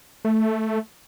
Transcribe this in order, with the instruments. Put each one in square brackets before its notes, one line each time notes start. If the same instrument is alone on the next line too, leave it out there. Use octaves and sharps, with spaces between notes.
[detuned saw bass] A3